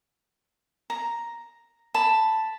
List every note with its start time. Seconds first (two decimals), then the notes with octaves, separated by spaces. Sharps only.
0.90 A#5
1.94 A5 B5